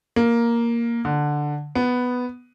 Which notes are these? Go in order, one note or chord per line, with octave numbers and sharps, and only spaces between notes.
A#3
D3
B3